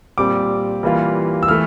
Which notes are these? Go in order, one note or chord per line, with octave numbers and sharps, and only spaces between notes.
A#2 G3 C4 D6
E3 G3 A#3 F4
E6
E3 A3 F6